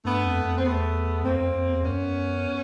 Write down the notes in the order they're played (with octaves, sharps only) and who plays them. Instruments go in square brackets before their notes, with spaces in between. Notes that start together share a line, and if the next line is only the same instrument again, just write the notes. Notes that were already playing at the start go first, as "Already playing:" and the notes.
[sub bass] G2 [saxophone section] A3 B3
[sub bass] F2
F2
[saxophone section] C4
[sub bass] E2 [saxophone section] A3 B3
[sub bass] F2 [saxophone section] A#3 C4
[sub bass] F2
F2
E2
[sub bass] F#2 [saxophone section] B3 C#4